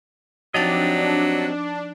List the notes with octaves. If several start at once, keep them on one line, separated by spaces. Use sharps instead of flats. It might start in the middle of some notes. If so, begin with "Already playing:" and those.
F3 F#3 C4 D4 D#4 G4 D#5 A6